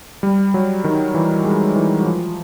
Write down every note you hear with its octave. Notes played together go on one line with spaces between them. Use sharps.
G3
F#3
D#3
E3
G#3
E3
F#3
F3